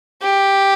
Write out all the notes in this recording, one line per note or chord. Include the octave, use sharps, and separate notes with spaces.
G4